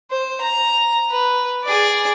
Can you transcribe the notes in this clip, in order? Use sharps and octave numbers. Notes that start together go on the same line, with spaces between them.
C5
A#5
B4
G#4 D5